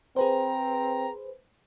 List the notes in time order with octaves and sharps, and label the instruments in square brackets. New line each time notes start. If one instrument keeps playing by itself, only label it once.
[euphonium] C4 [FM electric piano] G#4 B4 C5 [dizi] A#5